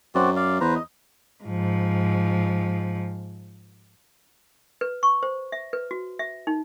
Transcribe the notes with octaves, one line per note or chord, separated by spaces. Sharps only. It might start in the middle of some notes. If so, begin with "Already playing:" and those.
F#2 C4 F#4 D5
D5 F5
E2 B4 C5 A#5
D#5
G#2 F3
B4
C#6
C5
E5
B4
F#4
E5
D#4